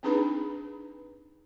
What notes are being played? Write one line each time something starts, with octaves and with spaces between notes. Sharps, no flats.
C4 D4 D#4 G#4 B4 B5